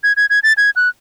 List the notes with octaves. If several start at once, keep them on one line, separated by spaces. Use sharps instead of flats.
G#6
G#6
G#6
A6
G#6
F#6